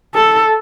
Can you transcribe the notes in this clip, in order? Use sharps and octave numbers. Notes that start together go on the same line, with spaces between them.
A4